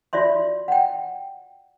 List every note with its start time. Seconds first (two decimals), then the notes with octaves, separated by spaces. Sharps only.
0.13 F4 F#4 D5 E5 C6
0.68 F#5 G5